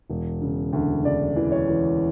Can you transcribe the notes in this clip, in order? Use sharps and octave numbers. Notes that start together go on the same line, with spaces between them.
E1
C#3
D2
C#3 D5
E3
C#5
E3